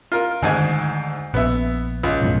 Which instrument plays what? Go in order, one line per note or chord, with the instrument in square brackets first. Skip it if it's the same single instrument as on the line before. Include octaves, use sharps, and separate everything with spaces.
[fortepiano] F4 A#4
[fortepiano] D2 G#2 G#5 [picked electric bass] D#3
[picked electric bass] A#1 [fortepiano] B3 E5
[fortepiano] C#2
[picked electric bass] B1 F#2 A2